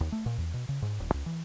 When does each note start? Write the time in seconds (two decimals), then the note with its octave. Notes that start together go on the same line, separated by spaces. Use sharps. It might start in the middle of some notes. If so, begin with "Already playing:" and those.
0.01 D#2
0.12 A3
0.26 A#2
0.38 E2
0.54 B2
0.69 C#3
0.82 G#2
1.00 D#1
1.14 C#2
1.26 E3